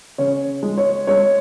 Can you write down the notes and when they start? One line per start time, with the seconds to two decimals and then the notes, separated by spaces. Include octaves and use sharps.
0.18 C#3 C#5
0.63 G#3
0.78 C#5
1.07 G#3 C#5